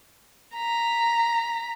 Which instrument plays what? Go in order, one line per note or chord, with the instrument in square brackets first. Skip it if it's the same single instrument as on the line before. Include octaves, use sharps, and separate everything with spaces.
[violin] A#5 B6